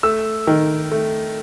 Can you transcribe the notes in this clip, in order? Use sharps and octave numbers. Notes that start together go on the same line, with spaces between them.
A3 E6
D#3
A3